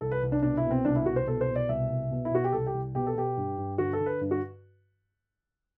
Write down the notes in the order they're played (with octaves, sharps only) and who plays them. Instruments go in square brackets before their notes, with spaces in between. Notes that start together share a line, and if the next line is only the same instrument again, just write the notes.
[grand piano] C2 A4
B4
C2
D4
B2 D4
E4
B2
C4
C2 D4
E4
C2 F#4
C5
B2 A4
C5
B2
D5
C2 E5
C2
B2
E4
B2 F#4
G4
C2 A4
G4
C2
B2 G4
A4
B2 G4
G2
G2
D3 F#4
A4
D3
B4
G2
F#4